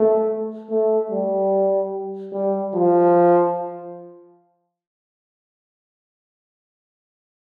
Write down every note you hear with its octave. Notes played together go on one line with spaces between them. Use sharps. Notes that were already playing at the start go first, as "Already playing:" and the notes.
Already playing: A3
A3
G3
G3
F3